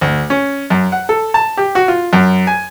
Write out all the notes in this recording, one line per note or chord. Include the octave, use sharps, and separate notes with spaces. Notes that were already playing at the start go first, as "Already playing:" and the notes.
D2
C#4
F#2
F#5
A4
A5
G4
F#4
F4
F#2
G#5